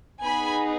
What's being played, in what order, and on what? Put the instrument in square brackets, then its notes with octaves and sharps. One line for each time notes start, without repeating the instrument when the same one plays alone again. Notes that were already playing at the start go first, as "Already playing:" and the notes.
[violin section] B3 D#4 G#4 G#5 B5